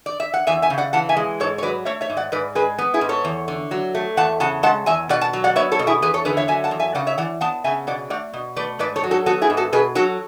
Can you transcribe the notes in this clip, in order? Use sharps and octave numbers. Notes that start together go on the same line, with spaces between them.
D5
E5
F#5
E2 E5 G#5
E5 G#5
C#3
D5 F#5
E3 F#5 A5
E5 G#5
G#3
G#2 A4 C#5
C#5
F#3 B4 D5
A3 C#5 E5
C#5 E5
G#2
D5 F#5
G#2 B4 D5
G#3 G#4 B4
B3
E4 G#4
G#2
A4 C#5
E2
D3
F#3
A3
E2 F#5 A5
C#3 F#5 A5
G#3 F#5 A5
E2 E5 G#5
B2 D5 F#5
F#5 A5
F#3
D5 F#5
B3 C#5 E5
A4 C#5
B2
E4 G#4
E2 G#4 B4
A4 C#5
D3 G#4 B4
C#5 E5
F#3 E5 G#5
F#5 A5
E2
E5 G#5
C#3 D5 F#5
C#5 E5
E3 D5 F#5
B3 F#5 A5
C#3 E5 G#5
B2 D5 F#5
A3 D5 F#5
B2
A3 B4 D5
G#2 B4 D5
A4 C#5
F#3
F#4 A4
B3 F#4 A4
E4 G#4
G#2
F#4 A4
B2 G#4 B4
F#3 F#4 A4